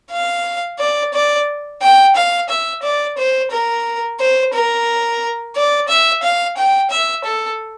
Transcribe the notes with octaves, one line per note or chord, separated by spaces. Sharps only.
F5
D5
D5
G5
F5
E5
D5
C5
A#4
C5
A#4
D5
E5
F5
G5
E5
A4